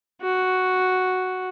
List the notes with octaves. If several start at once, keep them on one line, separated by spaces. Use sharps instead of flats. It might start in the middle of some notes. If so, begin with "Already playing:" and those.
F#4